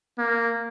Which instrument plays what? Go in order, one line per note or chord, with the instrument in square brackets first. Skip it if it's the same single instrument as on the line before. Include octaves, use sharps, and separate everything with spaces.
[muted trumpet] A#3